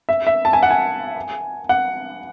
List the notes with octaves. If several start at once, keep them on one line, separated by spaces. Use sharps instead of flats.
E5
E5
A5
G#5
F#5
G#5
F#5